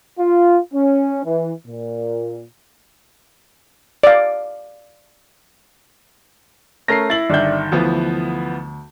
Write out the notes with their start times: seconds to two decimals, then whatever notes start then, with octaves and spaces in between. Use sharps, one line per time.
0.20 F4
0.74 C#4
1.25 E3
1.67 A#2
4.03 D5 F5
6.88 A3 C#4 A#4 A#6 C7
7.10 E4 A6 F#7
7.30 G1 D#3 D4 E5 G6
7.72 D2 E3 F3 B3